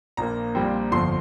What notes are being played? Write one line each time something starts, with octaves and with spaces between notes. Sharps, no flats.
A#1 A#2 A#3 A#5
A#1 A#2 G3 C4
G1 F2 D3 F3 C6